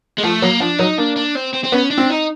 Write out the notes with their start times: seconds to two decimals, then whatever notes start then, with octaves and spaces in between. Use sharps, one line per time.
0.18 G#3
0.23 F3 A3
0.42 F#3 A#3
0.60 F3 D4
0.79 F#3 D#4
0.98 A#3 D4
1.16 D4
1.35 C4
1.53 C4
1.64 C4
1.72 B3 C#4
1.91 D4
1.98 C4
2.10 D#4